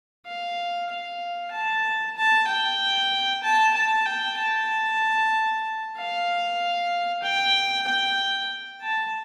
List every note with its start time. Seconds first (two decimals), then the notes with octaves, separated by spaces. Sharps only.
0.26 F5
0.89 F5
1.51 A5
2.16 A5
2.47 G5
3.43 A5
3.74 A5
4.05 G5
4.38 A5
5.97 F5
7.23 G5
7.87 G5
8.81 A5